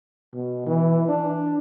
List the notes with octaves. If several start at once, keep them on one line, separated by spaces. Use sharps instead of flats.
B2
E3
D4